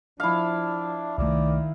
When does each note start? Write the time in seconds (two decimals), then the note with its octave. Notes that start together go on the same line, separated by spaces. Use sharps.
0.20 F3 D4 E4 F5
1.18 C2 D#3 E3 A3 D5